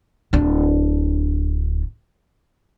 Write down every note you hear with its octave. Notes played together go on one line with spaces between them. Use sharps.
D1 D4